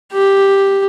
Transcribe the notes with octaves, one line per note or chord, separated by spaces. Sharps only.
G4